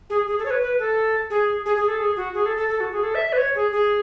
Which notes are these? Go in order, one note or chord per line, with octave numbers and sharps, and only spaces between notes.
G#4
G#4
A4
C#5
B4
B4
A4
G#4
G#4
G#4
A4
G#4
F#4
G#4
A4
A4
A4
F#4
G#4
A4
E5
E5
B4
C#5
G#4
G#4